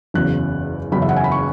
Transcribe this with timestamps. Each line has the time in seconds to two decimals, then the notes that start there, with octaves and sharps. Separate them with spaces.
0.14 F#1 E2 C#3 F#3 F#6
0.92 F#1 E2 C#3 F#3 B5
1.02 E5
1.09 F#5
1.16 G#5
1.24 B5
1.32 C#6